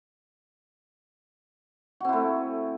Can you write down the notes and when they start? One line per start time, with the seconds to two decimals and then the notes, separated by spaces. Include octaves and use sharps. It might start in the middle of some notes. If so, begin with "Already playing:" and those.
2.00 F#4
2.05 C4
2.09 E4
2.13 A3